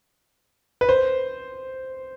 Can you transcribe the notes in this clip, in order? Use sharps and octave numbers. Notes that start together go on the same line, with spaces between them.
B4
C5